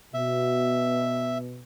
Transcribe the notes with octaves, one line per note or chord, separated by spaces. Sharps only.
B2 E5